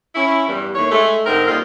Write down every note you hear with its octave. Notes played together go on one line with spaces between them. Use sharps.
C#4 E4
E2 G2
D#2 A2 C#5
G#3 A3
G#2 D3 C4 D#4 A#4
A#2 G3 C4 D#4 F4